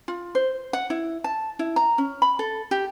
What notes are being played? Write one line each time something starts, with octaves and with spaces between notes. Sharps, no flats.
F4
C5
F#5
E4
A5
E4
A#5
C#4
B5
A4
G4